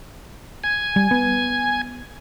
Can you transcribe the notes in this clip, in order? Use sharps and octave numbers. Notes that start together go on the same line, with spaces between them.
G#5
G3
B3